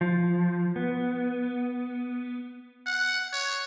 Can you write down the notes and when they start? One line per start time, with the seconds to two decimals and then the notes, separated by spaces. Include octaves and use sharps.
0.01 F3
0.76 B3
2.86 F#5
3.33 C#5